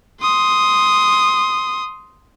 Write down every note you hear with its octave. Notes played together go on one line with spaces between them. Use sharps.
C6 D#6